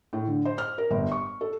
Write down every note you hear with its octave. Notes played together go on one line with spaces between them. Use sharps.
A2
D3
C5
F6
A#4
G1
C#6
A4